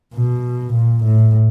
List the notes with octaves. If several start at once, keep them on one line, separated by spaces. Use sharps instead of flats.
B2
A#2
A2